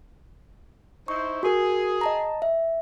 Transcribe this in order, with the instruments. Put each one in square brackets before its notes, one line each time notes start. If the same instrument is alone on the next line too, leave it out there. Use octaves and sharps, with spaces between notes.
[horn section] D#4 E4 C5 [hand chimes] C#6
[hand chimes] F#4 A#4 [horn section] G#4
[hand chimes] D#5 A5 A#5
E5